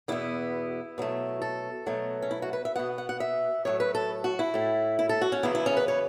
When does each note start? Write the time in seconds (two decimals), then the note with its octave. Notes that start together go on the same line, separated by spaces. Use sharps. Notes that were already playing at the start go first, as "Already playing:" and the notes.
0.08 E2 B2 B3 E4
0.98 B2 F#3 A3
1.42 A4
1.87 B2 F#3 A3
2.22 C#4
2.31 E4
2.42 F#4
2.53 B4
2.65 E5
2.76 B2 B3 F#5
2.98 F#5
3.09 F#5
3.20 E5
3.65 A2 F#3 A3 C#5
3.80 B4
3.95 A4
4.24 F#4
4.39 E4
4.54 A2 A3
4.99 E4
5.09 A4
5.21 F#4
5.32 C#4
5.43 E2 C#3 F#3 B3 E4
5.55 E4
5.66 C#4
5.77 B4
5.88 C#5